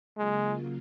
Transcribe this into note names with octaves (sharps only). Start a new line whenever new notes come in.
C#3 F#3 G#3 A#3 F4